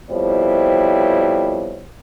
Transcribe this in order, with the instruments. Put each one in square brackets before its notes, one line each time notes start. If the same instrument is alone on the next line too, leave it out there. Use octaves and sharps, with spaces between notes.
[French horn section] F2 B2 G3 E4 C5 C#5